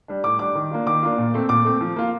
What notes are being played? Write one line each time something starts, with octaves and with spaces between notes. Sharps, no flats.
G3 D4
A2 D6
G3 D4 D6
D#3
A#3 D4 F4
D#3 D6
A#3 D4 F4
A#2
A3 C4
A#2 D6
A3 C4
F3
A#3 F4